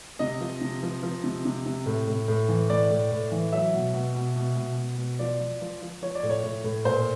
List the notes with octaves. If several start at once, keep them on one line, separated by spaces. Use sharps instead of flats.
C3 D#5
F3
C3
F3
F3
C3
C3
C3
A2
A2
A2
E3
A2 D5
A2
A2
E3
F#3 E5
B2
B2
B2
B2
B2
B2
B2
F3 D5
F3
F3
F3
F3 C#5
D5
A2
C#5
A2
A2
A#2 C5